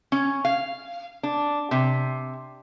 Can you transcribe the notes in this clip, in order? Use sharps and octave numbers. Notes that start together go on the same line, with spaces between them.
C#4
F5
D4
C3